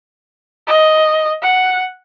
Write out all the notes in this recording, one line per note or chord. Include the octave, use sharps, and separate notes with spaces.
D#5
F#5